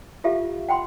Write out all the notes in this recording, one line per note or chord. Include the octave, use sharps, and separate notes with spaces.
F4 G4 A4 E5 F5
F#5 G5 B5 C6